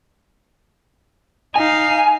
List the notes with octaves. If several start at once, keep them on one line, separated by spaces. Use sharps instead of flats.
D#4 F5 G#5